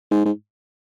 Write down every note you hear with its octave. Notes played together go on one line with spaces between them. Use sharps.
G#2
G#2